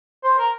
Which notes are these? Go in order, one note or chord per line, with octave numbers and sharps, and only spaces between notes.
C5
A#4